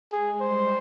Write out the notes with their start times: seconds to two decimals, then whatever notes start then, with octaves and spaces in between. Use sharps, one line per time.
0.12 G#3 G#4
0.41 G3 C5